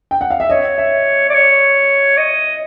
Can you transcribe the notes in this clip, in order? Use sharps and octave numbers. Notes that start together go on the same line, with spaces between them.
G5
F#5
F5
E5
C#5 D#5
E5
D5
C#5
D#5